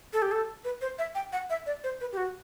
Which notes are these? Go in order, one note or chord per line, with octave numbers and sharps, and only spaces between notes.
A4
G4
A4
B4
C5
E5
G5
F#5
E5
D5
C5
B4
G4
F#4